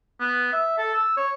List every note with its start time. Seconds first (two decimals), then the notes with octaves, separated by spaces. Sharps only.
0.20 B3
0.53 E5
0.78 A4
0.94 E6
1.17 C#5